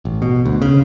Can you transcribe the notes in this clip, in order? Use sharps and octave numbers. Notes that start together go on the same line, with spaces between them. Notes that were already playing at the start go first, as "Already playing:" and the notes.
A1
B2
D2
C#3